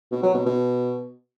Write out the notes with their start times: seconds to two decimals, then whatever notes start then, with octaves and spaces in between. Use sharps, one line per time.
0.11 B2
0.23 F#3
0.34 B2
0.46 B2